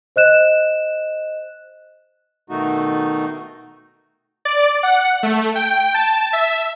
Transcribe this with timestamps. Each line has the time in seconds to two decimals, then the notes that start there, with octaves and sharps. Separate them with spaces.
0.16 C5 D#5 F#6 E7
2.50 B2 D#3 A3 D#4 F#4
4.45 D5
4.83 F#5
5.23 A3
5.55 G5
5.94 A5
6.33 E5